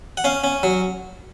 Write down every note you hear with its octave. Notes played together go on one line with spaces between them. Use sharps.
F#5
C#4 F5
C#4
F#3